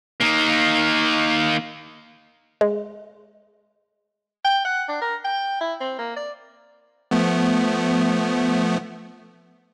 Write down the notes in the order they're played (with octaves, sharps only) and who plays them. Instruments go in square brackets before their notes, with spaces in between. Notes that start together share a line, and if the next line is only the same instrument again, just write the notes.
[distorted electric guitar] D#3 A#3
[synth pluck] G#3
[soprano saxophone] G5
F#5
D4
A#4
G5
E4
C4
A#3
D5
[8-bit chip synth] F3 A3 B3